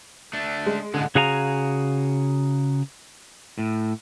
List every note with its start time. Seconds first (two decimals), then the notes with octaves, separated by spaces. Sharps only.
0.33 A3 D4
0.66 G#3
0.94 A2 D3 G#3
1.15 C#3 F#4 G#4 F5 G#5 A#5
3.59 A2